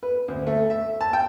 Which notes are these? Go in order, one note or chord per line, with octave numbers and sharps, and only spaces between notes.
B4
D2
A3
E5
A5
G5